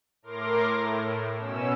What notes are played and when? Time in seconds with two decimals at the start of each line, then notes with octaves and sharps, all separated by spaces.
0.22 A2 A#4 C6 D6 A#6
0.77 A2
1.37 B2 C#4 E6